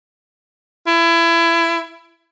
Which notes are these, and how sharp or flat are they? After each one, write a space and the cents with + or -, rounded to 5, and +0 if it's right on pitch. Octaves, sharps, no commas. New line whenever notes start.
E4 +25